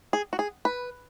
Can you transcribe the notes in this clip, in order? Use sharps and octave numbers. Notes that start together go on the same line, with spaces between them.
G#4
F#4
G#4
B4